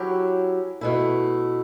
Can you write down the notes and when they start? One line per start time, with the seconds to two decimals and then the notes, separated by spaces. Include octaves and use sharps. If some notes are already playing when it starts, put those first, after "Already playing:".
Already playing: F#3 C#4 E4 G4
0.81 B2 A3 E4